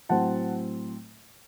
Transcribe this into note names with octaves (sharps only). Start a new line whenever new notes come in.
A2 F#3 C4 F#5 A5